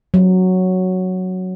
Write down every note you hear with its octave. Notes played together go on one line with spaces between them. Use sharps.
F#3